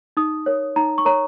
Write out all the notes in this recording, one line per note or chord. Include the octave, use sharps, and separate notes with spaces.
D#4 D#6
A#4 C#5
D#4 A#5
C#6
A#4 C#5 A#5